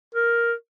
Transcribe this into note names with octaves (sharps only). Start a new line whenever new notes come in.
A#4